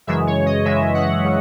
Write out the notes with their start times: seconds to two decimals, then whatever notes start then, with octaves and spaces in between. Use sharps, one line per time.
0.07 F#2 C#3 E3 G#3 E5
0.27 C#5
0.46 D#5
0.65 F#2 C#3 E3 G#3 E5
0.94 F#5
1.25 C#3